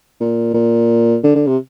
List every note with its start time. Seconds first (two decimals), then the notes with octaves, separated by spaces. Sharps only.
0.20 A#2
0.54 A#2
1.24 D3
1.35 D3
1.47 C3